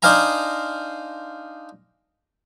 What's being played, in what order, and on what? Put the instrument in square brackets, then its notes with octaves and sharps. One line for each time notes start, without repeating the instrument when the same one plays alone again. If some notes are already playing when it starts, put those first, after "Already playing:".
[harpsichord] D4 D#4 C5 F5 G#5 A#5